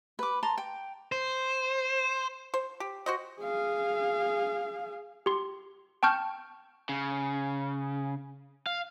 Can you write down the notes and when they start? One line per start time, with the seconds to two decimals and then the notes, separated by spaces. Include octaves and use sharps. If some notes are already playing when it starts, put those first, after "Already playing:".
0.19 B4 D6
0.43 A5 A#5 C6
0.57 G5
1.12 C5
2.54 C5
2.80 G4
3.06 F#4 C5 D#5
3.41 G#4 F5
5.26 G4 C6
6.03 G5 A5 C#6 F6 G6
6.89 C#3
8.66 F5